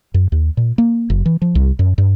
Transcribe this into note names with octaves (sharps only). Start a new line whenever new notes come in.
F#2
D#2
A#2
A#3
F#1
E3
F3
C2
F#2
G2